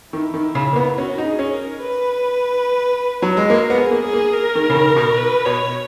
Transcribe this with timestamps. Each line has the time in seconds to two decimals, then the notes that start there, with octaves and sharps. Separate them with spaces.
0.13 D#3 E4
0.34 D#3
0.55 C#3
0.73 A#3
0.76 B3
0.97 C#4 F#4
1.18 D#4
1.25 G#4
1.39 C#4
1.53 A#4
1.81 B4
3.22 F#3
3.37 G#3
3.50 A#3 A#4
3.70 B3
3.77 G#4
3.91 A#3
4.05 G#4
4.13 A#3
4.34 A#4
4.55 D#3
4.70 C#3
4.75 D#3
4.96 B2
5.18 B4
5.45 B2 C#5